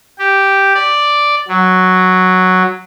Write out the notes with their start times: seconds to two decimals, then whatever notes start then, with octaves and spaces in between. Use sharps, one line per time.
0.18 G4
0.75 D5
1.48 F#3